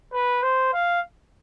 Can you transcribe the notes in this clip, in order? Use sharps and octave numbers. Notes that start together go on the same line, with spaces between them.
B4
C5
F5